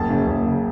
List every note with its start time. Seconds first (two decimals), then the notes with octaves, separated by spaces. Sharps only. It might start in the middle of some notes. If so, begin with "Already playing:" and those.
Already playing: F#1 A5
0.09 F#2 C#3
0.27 F#1
0.46 C#3